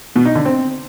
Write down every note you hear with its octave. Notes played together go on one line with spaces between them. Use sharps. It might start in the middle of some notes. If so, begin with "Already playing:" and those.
B2
D#4
D3
C4